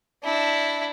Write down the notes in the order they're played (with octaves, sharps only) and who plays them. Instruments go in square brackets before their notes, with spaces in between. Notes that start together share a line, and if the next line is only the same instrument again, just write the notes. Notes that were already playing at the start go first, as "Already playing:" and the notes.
[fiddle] D4 E4